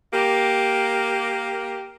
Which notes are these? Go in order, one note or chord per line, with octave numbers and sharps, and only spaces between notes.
A#3 G4